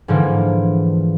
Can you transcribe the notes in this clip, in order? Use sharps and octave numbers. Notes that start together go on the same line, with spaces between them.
G#2 D3 E3 F3 A#3